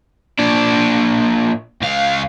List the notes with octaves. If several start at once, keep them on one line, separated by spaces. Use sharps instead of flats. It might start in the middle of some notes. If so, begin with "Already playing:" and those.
A#2 D4
C#2 F5